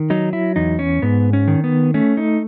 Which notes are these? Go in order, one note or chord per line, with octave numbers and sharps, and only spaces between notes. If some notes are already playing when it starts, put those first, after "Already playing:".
Already playing: D#3
F#3 D#4
E4
E2 D#4
C#4
G#2 B3
C#4
D#3
B3
A3 C#4
D#4